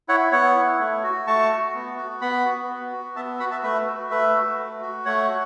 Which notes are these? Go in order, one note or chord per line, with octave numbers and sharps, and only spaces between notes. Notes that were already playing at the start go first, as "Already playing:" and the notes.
E4 C#5 F#5
B3 C#5 F#5
E4
A3
F#4
A3 A5 C#6
F#4
B3
F#4
B3 F#5 B5
F#4
B3
F#4
B3 E5 A5
F#4 F#5 B5
E5 A5
A3 B4 E5
F#4
A3 B4 E5
F#4
A3
F#4
A3 C#5 F#5
F#4